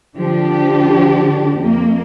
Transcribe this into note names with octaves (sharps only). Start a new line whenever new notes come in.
D3 F3 D4 G4
F2 A#3